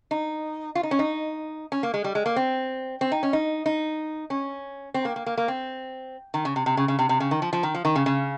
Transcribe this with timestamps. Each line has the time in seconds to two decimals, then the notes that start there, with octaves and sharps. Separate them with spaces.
0.11 D#4
0.75 F4
0.83 D#4
0.91 C#4
0.99 D#4
1.72 C#4
1.83 A#3
1.94 G#3
2.04 G3
2.15 G#3
2.26 A#3
2.36 C4
3.01 C4
3.12 D#4
3.23 C#4
3.33 D#4
3.66 D#4
4.30 C#4
4.94 C4
5.05 A#3
5.16 A#3
5.26 A#3
5.38 A#3
5.48 C4
6.34 D#3
6.45 C#3
6.56 C3
6.66 C3
6.77 C#3
6.88 C#3
6.99 C3
7.09 C3
7.20 C#3
7.31 D#3
7.42 F3
7.53 F3
7.63 D#3
7.74 F3
7.85 D#3
7.96 C#3
8.06 C#3